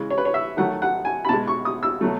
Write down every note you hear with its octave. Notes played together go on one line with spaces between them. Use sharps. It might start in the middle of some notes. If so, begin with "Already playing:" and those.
Already playing: C#3 E3 G#3
C#5
B4
C#5
E5
D#3 F#3 A3 F#5
F#5
G#5
B5
B2 G#3 A5
C#6
D#6
E6
B2 F#3 A3